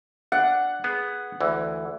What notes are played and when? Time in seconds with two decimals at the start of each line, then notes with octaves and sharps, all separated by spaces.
0.32 D4 F#5
0.84 B3 G#4
1.41 D2 E3